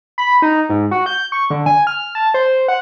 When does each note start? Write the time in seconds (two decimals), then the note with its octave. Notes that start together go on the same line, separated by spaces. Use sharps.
0.18 B5
0.42 D#4
0.70 G#2
0.91 F#4
1.06 G6
1.32 C#6
1.50 D3
1.66 G#5
1.87 F6
2.15 A5
2.34 C5
2.68 F#5